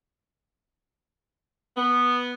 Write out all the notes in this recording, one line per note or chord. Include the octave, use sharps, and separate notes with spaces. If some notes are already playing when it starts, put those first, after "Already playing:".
B3